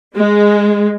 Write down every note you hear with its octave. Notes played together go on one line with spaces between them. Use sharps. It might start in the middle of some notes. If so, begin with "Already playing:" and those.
G#3